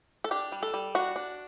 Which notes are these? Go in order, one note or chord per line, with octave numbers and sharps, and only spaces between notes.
A4
D4 G4
G3
A4
G3
D4 F#4
D4